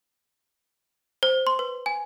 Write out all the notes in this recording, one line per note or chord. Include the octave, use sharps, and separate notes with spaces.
C5
C6
B4
G#5